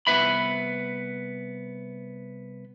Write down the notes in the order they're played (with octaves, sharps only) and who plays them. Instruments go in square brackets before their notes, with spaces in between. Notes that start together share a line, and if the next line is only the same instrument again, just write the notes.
[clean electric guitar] C2 B3 B4 E5 B5